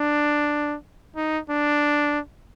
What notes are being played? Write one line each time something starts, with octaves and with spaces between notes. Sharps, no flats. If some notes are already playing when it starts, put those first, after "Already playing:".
Already playing: D4
D#4
D4